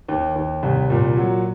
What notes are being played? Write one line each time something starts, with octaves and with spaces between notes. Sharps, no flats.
D#2
D#2
C2
A#2
F#3